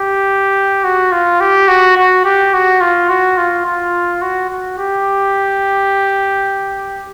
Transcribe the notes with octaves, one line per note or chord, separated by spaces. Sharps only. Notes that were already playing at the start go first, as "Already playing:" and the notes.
Already playing: G4
F#4
F4
G4
F#4
F#4
G4
F#4
F4
F#4
F4
F4
F#4
F#4
G4